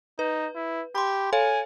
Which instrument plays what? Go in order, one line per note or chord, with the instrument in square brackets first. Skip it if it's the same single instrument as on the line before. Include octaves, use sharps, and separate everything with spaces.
[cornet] D#4 [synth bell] B4
[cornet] E4
[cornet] G4 [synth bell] B5 C6
[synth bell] A4 C#5 F5 [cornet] G#5